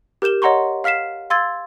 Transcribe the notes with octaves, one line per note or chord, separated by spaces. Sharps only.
G4 A#4 G6 E7 G7
C#5 D#5 F#5 A#5 C6 C#6
F5 F6 B6 C7 E7
F5 C6 E6 G#6 A6